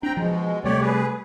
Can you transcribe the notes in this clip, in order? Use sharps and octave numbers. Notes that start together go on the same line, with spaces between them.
C4 D4 G5 A#5
B2 F3 G#3
C3 G3 A3 G4 C#5 D5
G#4 B4